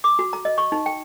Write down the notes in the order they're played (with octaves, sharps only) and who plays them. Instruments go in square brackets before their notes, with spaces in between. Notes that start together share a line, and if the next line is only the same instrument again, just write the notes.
[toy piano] D6
F#4
A#5
D#5
C#6
D#4
G5